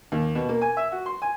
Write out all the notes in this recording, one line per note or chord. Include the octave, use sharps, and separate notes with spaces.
D#2
B2
A#3
G#5
E5
F#4
C6
G#5